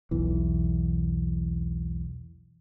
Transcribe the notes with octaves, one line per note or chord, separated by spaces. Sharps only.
B1 E2 E3